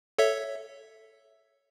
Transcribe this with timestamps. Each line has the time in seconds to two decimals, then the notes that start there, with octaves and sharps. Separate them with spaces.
0.19 A4 C#5 E5